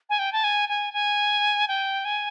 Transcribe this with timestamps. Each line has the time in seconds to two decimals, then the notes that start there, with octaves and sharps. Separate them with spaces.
0.10 G#5
0.19 G5
0.32 A5
0.44 G#5
0.69 G#5
0.93 G#5
1.68 G5
2.05 G#5